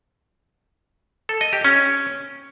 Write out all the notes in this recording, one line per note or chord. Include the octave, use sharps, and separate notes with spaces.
A4
D#5
G4
C#4